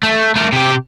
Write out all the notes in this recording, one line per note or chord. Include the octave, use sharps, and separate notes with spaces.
A3
A3 A#4
C3 G4